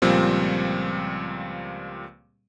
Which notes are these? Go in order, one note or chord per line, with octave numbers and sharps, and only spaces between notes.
C#2 A#2 F3 G3 C4